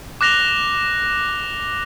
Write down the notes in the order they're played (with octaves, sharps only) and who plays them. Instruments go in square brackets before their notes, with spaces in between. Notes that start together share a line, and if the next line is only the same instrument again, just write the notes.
[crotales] D6 F#6 A#6 F7 G7